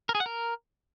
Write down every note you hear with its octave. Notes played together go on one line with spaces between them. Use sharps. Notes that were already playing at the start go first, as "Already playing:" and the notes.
A#4
G#4
F#5
A#4